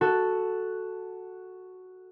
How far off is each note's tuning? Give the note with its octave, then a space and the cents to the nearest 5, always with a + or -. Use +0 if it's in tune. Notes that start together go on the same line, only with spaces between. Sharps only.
F#4 +0 A4 +0